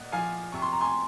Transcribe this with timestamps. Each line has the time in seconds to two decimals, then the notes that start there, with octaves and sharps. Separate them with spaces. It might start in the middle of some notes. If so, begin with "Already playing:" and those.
Already playing: A#2 D#5 F#5
0.12 F3 F5 G#5
0.52 C3 C#6
0.62 C6
0.72 A#5
0.81 G#5 C6